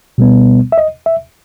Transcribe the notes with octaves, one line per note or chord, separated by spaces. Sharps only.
B2 G3 B3
E5
D#5
E5